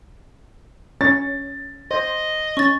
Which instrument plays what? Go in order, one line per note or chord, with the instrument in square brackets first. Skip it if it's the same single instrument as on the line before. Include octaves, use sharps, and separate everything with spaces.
[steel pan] C#4 C#5 [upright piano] A6
[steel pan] C5 [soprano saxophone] D#5
[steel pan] C#4 [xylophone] C#6 A6